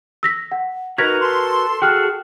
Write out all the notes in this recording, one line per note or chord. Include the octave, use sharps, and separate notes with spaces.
E6 A#6 B6
F#5
D#4 F#4 A#4 B4 A#5 G#6 B6
A4 C6
F#4 G#4 A4 G5 F6 F#6